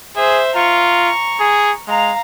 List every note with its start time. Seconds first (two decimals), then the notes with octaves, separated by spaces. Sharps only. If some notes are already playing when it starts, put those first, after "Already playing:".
0.16 G#4 C5 E5
0.56 F4 A#5 C#6
1.40 G#4
1.88 G#3 F5 A#5